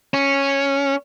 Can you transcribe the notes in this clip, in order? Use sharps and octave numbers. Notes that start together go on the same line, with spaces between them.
C#4